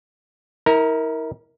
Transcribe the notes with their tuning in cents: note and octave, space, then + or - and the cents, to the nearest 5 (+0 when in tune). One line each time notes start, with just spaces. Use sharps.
E4 -40 A#4 +0